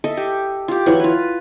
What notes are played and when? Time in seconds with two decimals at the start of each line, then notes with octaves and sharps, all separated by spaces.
0.04 A4 D#5 E5
0.17 G4
0.68 F4 G4
0.86 E3 F#3 E4
1.00 F4 B4